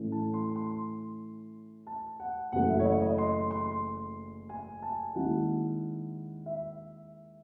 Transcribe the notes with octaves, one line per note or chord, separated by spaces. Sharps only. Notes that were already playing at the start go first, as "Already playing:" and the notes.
Already playing: A2 E3 A3 C#4 E4
A5
C6
C6
A5
F#5
F#1 F#2 E3 A3 F#5
E5
C#5
D#5
D#5
C6
C6
G#5
A5
D#2 D#3 G#3 C#4 E4 F#5
E5